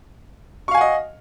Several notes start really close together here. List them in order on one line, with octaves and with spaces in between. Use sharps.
C#6 F5 G#5 F#5 D#5